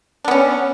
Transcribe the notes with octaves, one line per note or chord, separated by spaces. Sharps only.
B3 C#4 D4